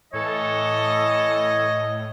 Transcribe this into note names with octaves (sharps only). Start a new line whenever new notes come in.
A2 E3 A4 C#5 D#5